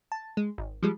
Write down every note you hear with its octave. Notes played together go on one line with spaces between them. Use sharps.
A5
G#3
G#1
F3 G3 G#3